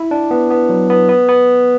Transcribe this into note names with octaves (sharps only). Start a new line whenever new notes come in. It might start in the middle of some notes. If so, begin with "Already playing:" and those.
Already playing: E4
D4
B3
B3
F#3
B3
B3
B3